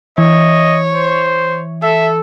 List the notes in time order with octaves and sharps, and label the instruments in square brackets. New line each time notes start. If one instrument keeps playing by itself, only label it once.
[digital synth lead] E3 [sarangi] C#5 [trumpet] D#5
[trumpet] C5
[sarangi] A4 [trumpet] E5